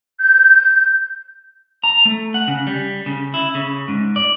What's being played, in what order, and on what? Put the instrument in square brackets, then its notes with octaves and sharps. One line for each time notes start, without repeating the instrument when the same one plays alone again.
[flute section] G6
[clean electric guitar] A#5
A3
F#5
C#3
G3
C#3
E4
C#3
G#2
D5